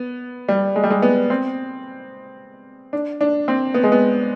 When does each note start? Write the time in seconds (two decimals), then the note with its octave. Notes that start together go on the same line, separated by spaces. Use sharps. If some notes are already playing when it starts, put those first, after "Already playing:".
Already playing: B3
0.48 G3
0.76 G#3
0.84 G3
0.90 G#3
1.02 B3
1.30 C4
2.93 D4
3.21 D4
3.48 C4
3.74 B3
3.84 G#3
3.92 B3